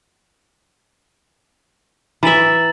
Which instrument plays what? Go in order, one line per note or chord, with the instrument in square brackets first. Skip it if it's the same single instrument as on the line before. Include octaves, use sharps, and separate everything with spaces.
[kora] E3 E5 [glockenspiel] A#5 A6 F#7